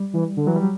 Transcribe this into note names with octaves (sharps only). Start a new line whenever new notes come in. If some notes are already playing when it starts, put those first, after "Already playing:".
Already playing: G3
E3
D3
E3 F#3
G3